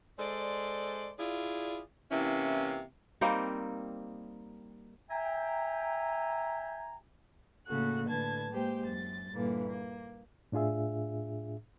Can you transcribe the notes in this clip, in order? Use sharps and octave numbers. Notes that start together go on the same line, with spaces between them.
G#3 A4 C5 D5
E4 F4 G#4 D5
C3 E3 A#3 C#4 E4
G3 A#3 C4 D#4
E5 G5 G#5 A#5
A2 C#3 A#3 F#4 A4 F#6
A2 D3 B4 A5 G#6
G#3 A#3 G4 C5 G5
F#2 A6
G2 A#2 D3 E3 A#3
A#3
A2 D4 F4 G#4 E5